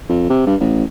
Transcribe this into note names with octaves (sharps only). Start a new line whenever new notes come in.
F2
C3
G2
A1